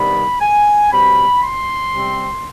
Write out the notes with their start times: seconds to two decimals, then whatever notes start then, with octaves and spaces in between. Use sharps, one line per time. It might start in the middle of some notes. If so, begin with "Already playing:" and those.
Already playing: C3 D#3 G3 B3 D4 B5
0.41 G#5
0.91 B2 G3 C4 B5
1.42 C6
1.93 C3 G3 C4